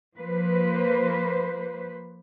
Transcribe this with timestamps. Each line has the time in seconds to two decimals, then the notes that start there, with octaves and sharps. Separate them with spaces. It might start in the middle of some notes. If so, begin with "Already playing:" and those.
0.17 F3 A#3 B4 C5